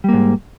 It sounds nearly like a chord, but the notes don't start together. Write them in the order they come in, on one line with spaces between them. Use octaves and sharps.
G3 A#3 G#2